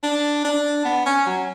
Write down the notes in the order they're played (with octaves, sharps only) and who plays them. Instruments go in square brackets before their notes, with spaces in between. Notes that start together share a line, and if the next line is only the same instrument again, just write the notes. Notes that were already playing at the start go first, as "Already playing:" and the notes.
[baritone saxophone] D4
D4
B3
C#4
F#3